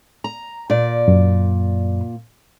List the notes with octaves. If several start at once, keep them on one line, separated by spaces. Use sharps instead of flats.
A#5
A#2 D5
F#2